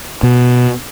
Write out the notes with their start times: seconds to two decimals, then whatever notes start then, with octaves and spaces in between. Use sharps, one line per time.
0.23 B2